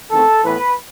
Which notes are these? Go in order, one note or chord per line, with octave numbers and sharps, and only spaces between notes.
E2 D#3 A3 C4 A4
A2 E3 B3 B4